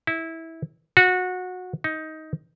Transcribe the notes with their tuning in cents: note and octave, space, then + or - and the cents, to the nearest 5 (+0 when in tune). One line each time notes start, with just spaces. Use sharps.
E4 -15
F#4 -20
D#4 +15